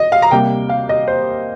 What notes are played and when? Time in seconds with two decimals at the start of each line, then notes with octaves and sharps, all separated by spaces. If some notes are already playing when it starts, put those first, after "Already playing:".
Already playing: D#5
0.12 F5
0.22 A#5
0.31 C3 G3 A#3 G5
0.69 F5
0.89 D#5
1.08 C5